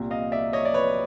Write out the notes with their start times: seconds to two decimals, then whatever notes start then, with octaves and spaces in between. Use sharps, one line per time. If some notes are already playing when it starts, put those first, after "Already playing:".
Already playing: C2 A#2
0.11 D#5 F5
0.32 D5 E5
0.53 C#5 D#5
0.65 D5
0.74 B4 C#5